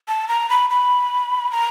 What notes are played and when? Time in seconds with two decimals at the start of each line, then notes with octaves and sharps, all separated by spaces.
0.08 A5
0.28 A#5
0.50 B5
0.70 B5
1.52 A#5